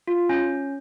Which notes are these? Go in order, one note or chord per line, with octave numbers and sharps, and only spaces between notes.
F4
C#4